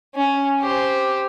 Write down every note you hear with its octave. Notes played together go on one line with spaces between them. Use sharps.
C#4
G4 C5